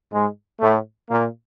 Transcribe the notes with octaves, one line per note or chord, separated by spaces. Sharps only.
G#2 G#3
A2 A3
A#2 A#3